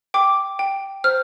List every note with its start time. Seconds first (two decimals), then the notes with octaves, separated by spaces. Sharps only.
0.14 G5 D6
0.59 G5
1.04 C5 F6